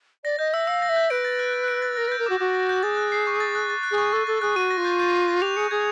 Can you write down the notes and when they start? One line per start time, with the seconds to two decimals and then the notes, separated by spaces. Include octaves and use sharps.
0.24 D5 A#6
0.39 D#5 G6
0.53 E5 E6
0.67 F5 E6
0.82 A#6
0.89 E5
0.96 G6
1.10 B4 D7
1.25 A6
1.39 F#6
1.54 F#6
1.68 D7
1.82 A6
1.97 A#4 A#6
2.08 B4 G6
2.19 A#4
2.26 F#4 D6
2.40 F#4 D6
2.54 A#6
2.69 G6
2.83 G#4 A6
2.97 F#6
3.12 C7
3.27 C#6
3.40 A6
3.55 F#6
3.70 A6
3.83 F#6
3.91 G#4
3.98 C#6
4.13 A4 C#6
4.27 A4 A6
4.42 G#4 F#6
4.56 F#4 D#7
4.71 A#6
4.77 F4
4.85 G6
4.99 G6
5.13 D#7
5.28 A#6
5.42 G4 F7
5.56 G#4 C#7
5.71 G#4 G#6